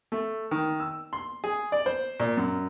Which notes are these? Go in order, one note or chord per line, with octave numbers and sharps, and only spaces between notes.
A3
D#3
E6
C6
G#4
D5
C5
A#2
F#2